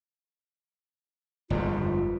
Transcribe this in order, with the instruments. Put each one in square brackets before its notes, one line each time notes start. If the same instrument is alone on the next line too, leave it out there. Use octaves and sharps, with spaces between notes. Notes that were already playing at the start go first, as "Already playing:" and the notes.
[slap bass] G1 F2 G#2 [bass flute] F4